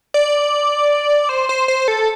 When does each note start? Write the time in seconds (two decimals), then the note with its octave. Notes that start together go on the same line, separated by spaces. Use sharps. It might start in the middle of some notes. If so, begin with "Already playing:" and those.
0.14 D5
1.29 C5
1.49 C5
1.68 C5
1.88 A4